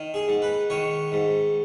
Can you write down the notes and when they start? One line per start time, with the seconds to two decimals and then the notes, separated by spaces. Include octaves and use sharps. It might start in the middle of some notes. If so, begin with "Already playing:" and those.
Already playing: D#3
0.14 G#4
0.28 G#2
0.42 B4
0.70 D#3 C#5
1.12 G#2